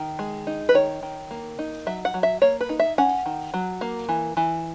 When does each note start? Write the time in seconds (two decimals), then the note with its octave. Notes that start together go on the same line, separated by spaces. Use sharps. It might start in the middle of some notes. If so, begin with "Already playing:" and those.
Already playing: D#3
0.19 G#3
0.47 D#4
0.69 B4
0.74 D#3 C#5
1.03 D#3
1.31 A#3
1.59 D#4
1.87 F#3 E5
2.05 F#5
2.14 F#3
2.23 E5
2.42 A#3 C#5
2.61 B4
2.69 D#4
2.80 E5
2.98 C#4 F#5
3.26 D#3
3.54 F#3
3.81 A#3
4.09 E3
4.37 E3